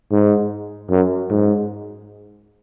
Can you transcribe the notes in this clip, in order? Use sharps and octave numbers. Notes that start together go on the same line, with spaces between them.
G#2
F#2
G#2